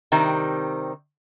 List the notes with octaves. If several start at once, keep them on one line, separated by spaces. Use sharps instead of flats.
C3 D#3 G3 C4